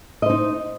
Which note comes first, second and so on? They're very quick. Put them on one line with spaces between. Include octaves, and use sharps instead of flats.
D#5 C5 D#4